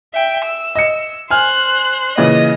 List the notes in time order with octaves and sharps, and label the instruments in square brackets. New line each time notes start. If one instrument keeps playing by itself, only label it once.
[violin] E5 G5
E6
[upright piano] D#5 C#7
[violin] C5 F#6 [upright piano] G#5 F6
[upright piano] A#2 C#3 E3 [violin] D#5